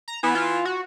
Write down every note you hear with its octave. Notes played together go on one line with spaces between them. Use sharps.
A#5
E3 B3
F4
F#4